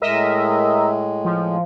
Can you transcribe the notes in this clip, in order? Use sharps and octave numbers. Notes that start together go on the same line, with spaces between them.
A2 G#3 A#4 D#5 E5
F3